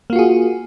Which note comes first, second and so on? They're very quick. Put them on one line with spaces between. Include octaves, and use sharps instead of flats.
A#3 F4 F#4 G#4